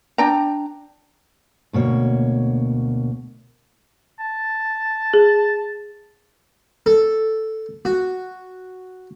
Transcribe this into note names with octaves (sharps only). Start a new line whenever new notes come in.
D4 G5 A#5
D2 B2 A#3 C#5
A5
G#4
A4
F#4